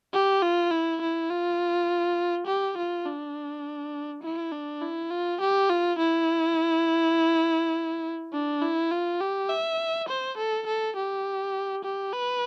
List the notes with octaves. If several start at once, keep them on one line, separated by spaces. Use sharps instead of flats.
G4
F4
E4
E4
F4
G4
F4
D4
E4
D4
E4
F4
G4
F4
E4
D4
E4
F4
G4
E5
C5
A4
A4
G4
G4
B4